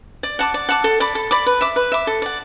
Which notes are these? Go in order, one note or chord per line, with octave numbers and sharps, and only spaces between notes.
D5
F#5 A5 D6
D5
F#5 A5 D6
A4
D5 B5 D6
A4
D5 B5 D6
B4
E5 D6
B4
E5 D6
A4
D5 F#5